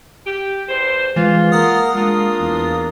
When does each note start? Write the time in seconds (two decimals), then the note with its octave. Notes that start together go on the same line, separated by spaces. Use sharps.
0.26 G4
0.68 E2 C5
1.16 E3 G#3 F4
1.52 A#3 F#5 D#6 F6
1.94 G#3 A#3 D4 F4
2.39 E2